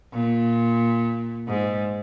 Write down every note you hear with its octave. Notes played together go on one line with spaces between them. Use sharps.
A#2
G#2